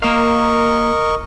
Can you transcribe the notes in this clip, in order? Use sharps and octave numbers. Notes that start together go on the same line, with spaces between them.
A#3 A#4 D#5 F5 C#6